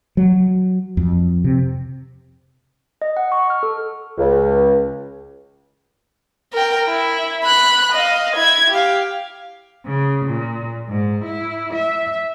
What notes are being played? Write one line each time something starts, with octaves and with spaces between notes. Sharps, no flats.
F#3
F2
C3
D#5
F#5
C#6
F6
A4
C#2
A#4 G5
E4
B5 F#6
D#5 F5
E4 G#6
G4 F5
C#3
A#2
G#2
E4
E5